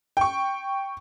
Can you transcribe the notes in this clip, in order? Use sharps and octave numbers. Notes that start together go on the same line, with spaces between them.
G5 C#6